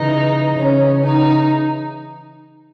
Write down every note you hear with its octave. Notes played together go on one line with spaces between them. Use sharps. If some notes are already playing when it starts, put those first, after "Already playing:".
Already playing: C#3 E3 D#4
C#3 E3 C#4
D#4